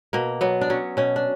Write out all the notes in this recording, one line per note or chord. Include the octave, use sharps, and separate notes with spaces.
B2 A#3
F#3 B3
D4
F#3 C#4
B2 C#4
D4